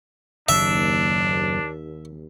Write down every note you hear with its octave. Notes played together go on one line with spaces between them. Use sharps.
F#1 D#2 D4 E5